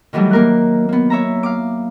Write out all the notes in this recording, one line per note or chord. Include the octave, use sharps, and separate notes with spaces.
D#3 E3 F#3 G3 A3
A#3 A#4 F#6
A#3 B3
C#5 E5 A#5
F5 D6